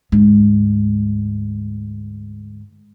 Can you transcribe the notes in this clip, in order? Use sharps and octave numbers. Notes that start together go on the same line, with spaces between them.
D2 G#2